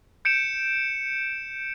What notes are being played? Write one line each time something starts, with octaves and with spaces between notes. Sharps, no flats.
G6 C#7 D7 E7